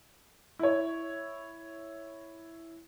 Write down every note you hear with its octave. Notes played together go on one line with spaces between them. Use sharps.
E4 C#5